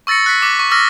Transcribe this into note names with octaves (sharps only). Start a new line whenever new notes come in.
C#6 E6 A6 A#6 C#7
F#6 B6
D6 B6
C#6
D6 E6 F6 A#6 B6